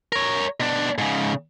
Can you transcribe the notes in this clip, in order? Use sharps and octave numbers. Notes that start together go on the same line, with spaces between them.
A#4 C#5
B2 D4
G#2 C#3